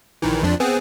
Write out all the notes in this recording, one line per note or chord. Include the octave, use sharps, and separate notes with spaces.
A#1 D#3 E3
F2 F3 D4
B3 C4 G#4